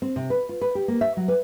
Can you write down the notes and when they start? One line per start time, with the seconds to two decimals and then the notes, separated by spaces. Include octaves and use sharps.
0.02 C4
0.16 C3
0.30 B4
0.49 F4
0.61 B4
0.75 G4
0.88 A#3
1.01 E5
1.17 F#3
1.28 B4